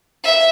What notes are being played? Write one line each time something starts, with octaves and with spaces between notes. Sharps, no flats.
E5